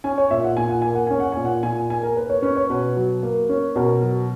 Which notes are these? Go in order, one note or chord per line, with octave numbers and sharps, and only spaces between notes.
C#4 G#5
C#5
A#2 E5
F#5
A#2 G#5
F#5
A#3 G#5
F#5
C#4 G#5
F#5
A#2 G#5
F#5
A#2 G#5
A#3 G#5
A#4
A#3 B4
C#5
C#4 B4
C#5
B2 B4
F#3
A#3
C#4
B2 A#4
F#3